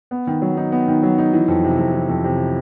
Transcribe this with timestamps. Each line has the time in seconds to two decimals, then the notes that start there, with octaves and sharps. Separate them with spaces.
0.11 B3
0.27 D#3
0.42 F#3
0.57 D#4
0.72 B3
0.88 D#3
1.03 F#3
1.18 D#4
1.33 E3
1.48 F2
1.64 C3
1.78 F2
1.94 E3
2.09 F2
2.24 C3